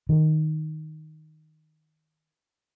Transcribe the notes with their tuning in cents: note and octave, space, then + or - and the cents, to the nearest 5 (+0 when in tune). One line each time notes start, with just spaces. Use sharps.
D#3 +0